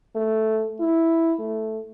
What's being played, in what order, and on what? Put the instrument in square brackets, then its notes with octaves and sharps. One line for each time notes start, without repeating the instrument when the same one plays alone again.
[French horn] A3
E4
A3